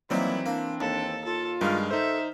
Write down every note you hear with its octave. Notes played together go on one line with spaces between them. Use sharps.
D#3 E3 F#3 G3 A#3 C4 E4
A#3 D4
D#2 A4
F4 A4
G2 D#3 G#3 F5 F6
D#4 A4 C5 E5